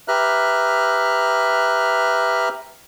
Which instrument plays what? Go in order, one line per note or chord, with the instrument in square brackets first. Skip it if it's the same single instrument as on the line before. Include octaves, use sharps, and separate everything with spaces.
[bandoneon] G4 B4 E5 A#5 F6 F#6